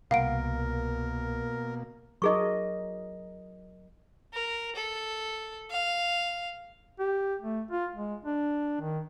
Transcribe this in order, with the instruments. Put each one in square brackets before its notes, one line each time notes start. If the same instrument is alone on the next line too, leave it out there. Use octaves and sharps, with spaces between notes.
[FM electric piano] C2 [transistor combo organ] B2 A#3 [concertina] A#4 [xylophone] F5 F#5 D7
[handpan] F#3 A#4 D#5 [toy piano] D#4 G#4 C#6
[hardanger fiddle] A#4
A4
F5
[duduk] G4
A3
F4
G#3
D4
D#3